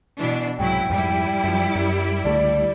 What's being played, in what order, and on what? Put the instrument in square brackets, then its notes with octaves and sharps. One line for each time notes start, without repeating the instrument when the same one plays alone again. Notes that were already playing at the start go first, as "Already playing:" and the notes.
[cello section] B2 E3 D4
[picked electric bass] C2 G#2 [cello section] F#3 E4 [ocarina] G5
[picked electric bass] F2 G#2 [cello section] G3 E4
[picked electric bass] F#2 F3
F#2
[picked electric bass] C#2 D3 A3 [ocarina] D5